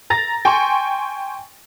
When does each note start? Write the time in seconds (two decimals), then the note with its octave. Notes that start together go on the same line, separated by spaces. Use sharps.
0.10 A#5 A6 A#6
0.45 G5 G#5 C6 C#6